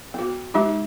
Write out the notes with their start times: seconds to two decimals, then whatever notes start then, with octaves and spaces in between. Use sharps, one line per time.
0.14 B3 F#4
0.54 G#3 D#4 G4